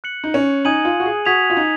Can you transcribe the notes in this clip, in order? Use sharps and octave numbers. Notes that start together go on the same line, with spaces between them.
F#6 C#7 F#7
D#4
C#4
D#4 G#5 D#6 G#6 D#7 F#7
F4
F#4
G#4
F#4 D#6 G#6 B6 F7
F4
D#4